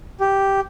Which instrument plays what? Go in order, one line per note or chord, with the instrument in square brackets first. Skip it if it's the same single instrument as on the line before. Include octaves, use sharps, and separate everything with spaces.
[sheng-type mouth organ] G4